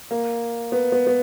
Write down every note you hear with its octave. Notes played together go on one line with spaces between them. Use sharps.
A#3
B3
B3
B3